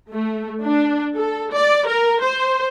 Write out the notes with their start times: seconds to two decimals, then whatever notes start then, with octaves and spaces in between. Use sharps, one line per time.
0.11 A3
0.62 D4
1.15 A4
1.53 D5
1.87 A#4
2.23 C5